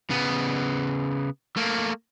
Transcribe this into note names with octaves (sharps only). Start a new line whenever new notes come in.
C#3 B3
A3 A#3